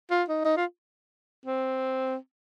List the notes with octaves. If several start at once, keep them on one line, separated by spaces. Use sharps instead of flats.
F4
D#4
D#4
F4
C4